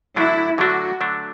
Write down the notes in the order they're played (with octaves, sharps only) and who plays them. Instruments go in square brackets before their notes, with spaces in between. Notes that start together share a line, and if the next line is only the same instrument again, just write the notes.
[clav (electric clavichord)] D3 F#3 A3 D4 [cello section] E4
[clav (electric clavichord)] D3 F#3 A3 D4 [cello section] F#4
[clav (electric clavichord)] D3 F#3 A3 D4